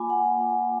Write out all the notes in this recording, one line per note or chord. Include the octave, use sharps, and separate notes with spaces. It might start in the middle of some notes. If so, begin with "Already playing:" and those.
Already playing: A#3 F4 G#5 B5 D6
F#5